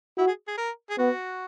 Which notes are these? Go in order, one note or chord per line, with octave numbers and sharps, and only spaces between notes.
E4 F#4
G#4
G#4
A#4
G#4
B3 F#4